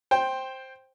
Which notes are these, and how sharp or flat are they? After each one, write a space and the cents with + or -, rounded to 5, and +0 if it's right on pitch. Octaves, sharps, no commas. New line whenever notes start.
C5 +10 G5 +0